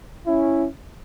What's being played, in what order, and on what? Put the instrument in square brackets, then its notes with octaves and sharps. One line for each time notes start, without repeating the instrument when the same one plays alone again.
[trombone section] C#4 E4